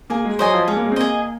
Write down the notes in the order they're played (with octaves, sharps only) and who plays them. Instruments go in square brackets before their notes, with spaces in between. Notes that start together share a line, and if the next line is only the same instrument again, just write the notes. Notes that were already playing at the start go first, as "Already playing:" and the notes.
[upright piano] A#3 [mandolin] G#4
[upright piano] G#3
[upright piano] F#3 [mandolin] C5 D#5 G#5
[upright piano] F3
[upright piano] G#3 [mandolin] C#4
[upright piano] A#3
G#3
C4
[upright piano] A#3 [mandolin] G#4 D#5